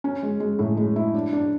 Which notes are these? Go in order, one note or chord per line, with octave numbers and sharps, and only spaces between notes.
C#4
G#3
G#3
A2
G#3
E4
D4
D4